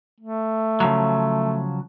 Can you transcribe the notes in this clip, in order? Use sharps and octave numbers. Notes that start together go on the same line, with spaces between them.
A3
C#3 F3 F#3